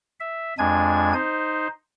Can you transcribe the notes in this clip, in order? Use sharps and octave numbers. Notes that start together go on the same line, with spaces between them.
E5
F2 G#3 D4 G#5 G#6
D#4 C5